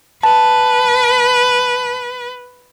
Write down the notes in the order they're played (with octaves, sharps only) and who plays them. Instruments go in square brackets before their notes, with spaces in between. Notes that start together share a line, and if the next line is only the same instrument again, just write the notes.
[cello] B4 [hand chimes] A5